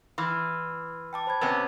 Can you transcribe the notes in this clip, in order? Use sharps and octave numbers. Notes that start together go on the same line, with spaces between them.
E3 C6 F6
G5 A5 D6
C5 B5 G#6
C3 B3 C#4